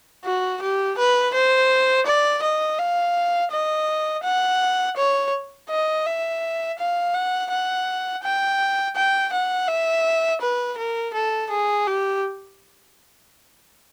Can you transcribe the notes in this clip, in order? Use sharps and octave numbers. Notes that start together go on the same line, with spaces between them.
F#4
G4
B4
C5
D5
D#5
F5
D#5
F#5
C#5
D#5
E5
F5
F#5
F#5
G5
G5
F#5
E5
B4
A#4
A4
G#4
G4